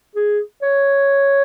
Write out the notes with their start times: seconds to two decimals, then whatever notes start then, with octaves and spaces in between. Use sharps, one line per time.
0.15 G#4
0.62 C#5